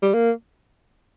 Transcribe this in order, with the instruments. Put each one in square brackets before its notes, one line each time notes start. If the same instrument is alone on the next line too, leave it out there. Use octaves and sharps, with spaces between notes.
[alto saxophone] G3
A#3